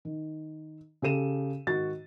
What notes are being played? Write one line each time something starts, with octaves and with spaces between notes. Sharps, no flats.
D#3
C#3 G4 A4 D#7 E7
G#2 D#3 F#4 A6